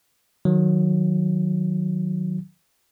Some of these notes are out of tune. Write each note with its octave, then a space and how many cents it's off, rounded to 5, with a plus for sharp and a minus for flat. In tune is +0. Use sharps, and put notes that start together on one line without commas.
D#3 +0 F#3 -10